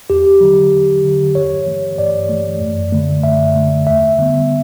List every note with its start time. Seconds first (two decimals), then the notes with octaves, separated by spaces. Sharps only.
0.10 E2 G4
0.41 D3 F#3
0.72 E2
1.04 D3 F#3
1.35 G2 C#5
1.67 E3 A3
1.98 G2 D5
2.29 E3 A3
2.61 F#2
2.92 D3 A3
3.23 F#2 E5
3.55 D3 A3
3.87 E2 E5
4.18 D3 G3 B3